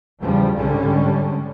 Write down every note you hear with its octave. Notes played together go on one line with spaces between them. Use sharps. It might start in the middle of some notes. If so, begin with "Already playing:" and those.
E2 C#3 F3 G3
C2 G#2 D3 G3 C#4